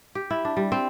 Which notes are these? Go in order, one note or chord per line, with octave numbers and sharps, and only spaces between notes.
G4
E4
D4
G3
C4